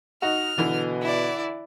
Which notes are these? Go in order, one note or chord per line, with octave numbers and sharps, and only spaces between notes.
D#4 F#4 F6
B2 D3 E3
E4 D5